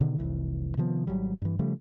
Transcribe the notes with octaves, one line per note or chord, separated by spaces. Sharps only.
B2 D3 D#3
F1 C2 E3
C3 D#3 F3 B3
G#1 D#2 F#3 G3
G2 E3
C#3 F3 G3 A3